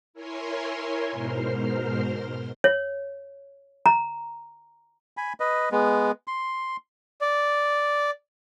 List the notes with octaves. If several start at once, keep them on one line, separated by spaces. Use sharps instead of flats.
E4 A#4 C#5 G#5 C6
G#2 B2 A#4 C5 C6 F6
C#5
A#5
G#5 B5
B4 D#5
G#3 B3
C6
D5